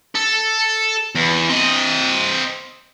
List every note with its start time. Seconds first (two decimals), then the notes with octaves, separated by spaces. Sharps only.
0.15 A4
1.15 E2
1.49 C4 D#5